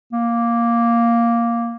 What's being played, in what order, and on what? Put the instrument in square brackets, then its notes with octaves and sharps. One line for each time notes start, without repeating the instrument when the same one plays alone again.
[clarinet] A#3